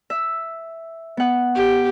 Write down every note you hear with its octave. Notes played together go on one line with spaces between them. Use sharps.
E5
B3 F#5
G4